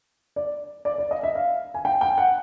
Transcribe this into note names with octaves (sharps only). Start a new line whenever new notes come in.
D5
D5
D5
D#5
E5
F5
G#5
G5
G5
F#5